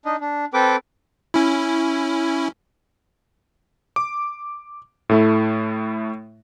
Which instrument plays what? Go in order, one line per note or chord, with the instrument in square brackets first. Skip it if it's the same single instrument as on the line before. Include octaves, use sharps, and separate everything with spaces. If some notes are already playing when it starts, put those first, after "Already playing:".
[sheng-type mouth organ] D4 D#4 D#5
D4
C4 A4 B4 G5 D6
[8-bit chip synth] C#4 E4
[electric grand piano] D6
A2 A3 E4